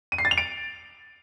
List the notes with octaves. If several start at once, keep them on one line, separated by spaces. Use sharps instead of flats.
D#7
C7
A6
F7
D7